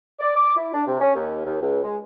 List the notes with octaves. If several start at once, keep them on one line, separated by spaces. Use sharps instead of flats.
D5
D6
E4
D4
C3
C#4
D#2
D#2
C#2
G#3